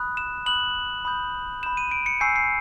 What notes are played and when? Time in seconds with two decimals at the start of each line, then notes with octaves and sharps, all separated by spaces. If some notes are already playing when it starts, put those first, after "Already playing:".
Already playing: B5 D#6 F#6
0.17 E7
0.46 B5 D#6 F#6 F#7
1.05 B5 D#6 G6
1.63 B5 D#6 G6 E7
1.77 D#7
1.91 D7
2.06 C#7
2.20 G#5 C#6 E6 G6 C7
2.36 C7